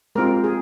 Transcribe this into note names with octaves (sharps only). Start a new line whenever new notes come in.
G#3 C4 F4 A#4
G#4